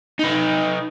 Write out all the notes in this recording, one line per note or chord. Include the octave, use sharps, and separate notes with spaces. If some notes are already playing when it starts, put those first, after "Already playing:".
D#4 B4